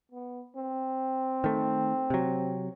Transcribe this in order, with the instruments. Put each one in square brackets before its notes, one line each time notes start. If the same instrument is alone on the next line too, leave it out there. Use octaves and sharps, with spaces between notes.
[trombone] B3
C4
[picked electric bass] D#3 A3
C3 F#3